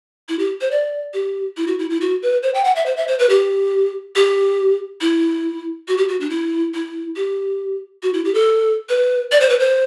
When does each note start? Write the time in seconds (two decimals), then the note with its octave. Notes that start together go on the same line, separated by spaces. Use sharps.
0.29 E4
0.39 G4
0.61 C5
0.71 D5
1.14 G4
1.57 E4
1.67 F#4
1.79 E4
1.90 E4
2.01 F#4
2.22 B4
2.43 C5
2.55 G5
2.64 F#5
2.76 E5
2.86 C5
2.97 E5
3.08 C5
3.19 B4
3.29 G4
4.16 G4
5.01 E4
5.88 F#4
5.98 G4
6.09 F#4
6.20 D4
6.30 E4
6.74 E4
7.16 G4
8.03 F#4
8.14 E4
8.25 G4
8.34 A4
8.89 B4
9.32 D5
9.40 C5
9.49 B4
9.59 C5